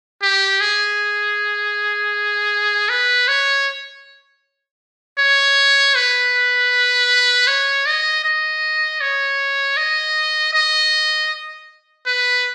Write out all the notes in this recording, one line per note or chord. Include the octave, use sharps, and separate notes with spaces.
G4
G#4
B4
C#5
C#5
B4
C#5
D#5
D#5
C#5
D#5
D#5
B4